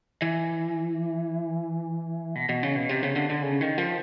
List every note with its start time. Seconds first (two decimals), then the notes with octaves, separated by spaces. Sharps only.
0.22 E3
2.35 B2
2.49 B2
2.63 C#3
2.76 B2
2.89 C3
3.03 C#3
3.16 D3
3.30 D3
3.43 C#3
3.61 D#3
3.78 F3